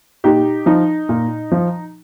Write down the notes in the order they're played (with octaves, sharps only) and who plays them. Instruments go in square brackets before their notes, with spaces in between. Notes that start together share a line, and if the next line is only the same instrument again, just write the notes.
[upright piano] A#2 D#4 G4
F3 D#4
A#2
F3